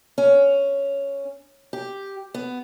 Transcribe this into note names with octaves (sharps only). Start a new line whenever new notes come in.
C#4
G4
B3